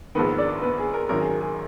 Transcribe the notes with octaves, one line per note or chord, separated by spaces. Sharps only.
A#1 G#2 D#3 B3 B4
D4 D5
B3 B4
G#4
A#4
G#1 F#2 D#3 A#4
G#4
G#4